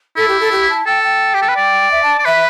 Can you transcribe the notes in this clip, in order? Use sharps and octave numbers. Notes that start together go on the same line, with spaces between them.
E4 A4
G4
A4
G4
A5
A4 G5
G5
G4
A4
B4
D5
E5
A5
D5
B4 E5